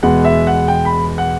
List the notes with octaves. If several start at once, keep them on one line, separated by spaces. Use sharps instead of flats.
E2 B2 G#3 B3 F#5
E5
F#5
G5
B5
F#5